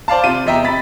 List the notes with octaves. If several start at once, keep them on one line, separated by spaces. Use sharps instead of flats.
C5 D5 F5 A5
C3 F4 D#7
E2 C3 D#5 E5 G5 A#5
B5 A6 B6